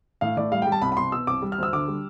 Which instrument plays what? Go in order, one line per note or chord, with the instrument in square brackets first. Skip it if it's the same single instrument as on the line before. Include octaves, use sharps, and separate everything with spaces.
[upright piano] A2 F5
A2 D5
G3 F5
G5
G3
A5
C2 B5
B5
C2 C6
B2 E6
C2 D6
G3
F6
D2 E6
D3 D6
G3